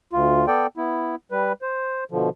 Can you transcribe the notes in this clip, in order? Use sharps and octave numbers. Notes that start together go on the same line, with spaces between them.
D2 F4
B3 A4 D5 G5
B3 E4
G3 B4
C5
B2 D3 F3